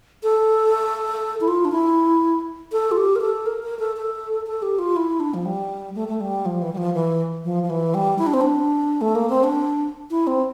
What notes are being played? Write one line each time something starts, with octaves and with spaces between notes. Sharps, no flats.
A4
E4
F4
D4
E4
A4
F4
G4
A#4
A4
A#4
A#4
A4
A4
A4
G4
F4
E4
D4
F3
G3
A3
A3
G3
F3
E3
G3
F3
E3
F3
F3
E3
G3
E4
D4
C4
D4
A3
A#3
C4
D4
E4
C4